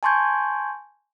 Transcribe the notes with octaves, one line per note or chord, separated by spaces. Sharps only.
G#5 A5 C6 C#6 G6 G#6